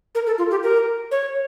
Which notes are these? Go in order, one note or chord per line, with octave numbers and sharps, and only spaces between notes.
A#4
A4
F4
G4
A#4
C#5